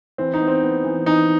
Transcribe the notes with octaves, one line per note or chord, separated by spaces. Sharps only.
E3 C4
D#4
B3
C4
B3
E3
E3 D#4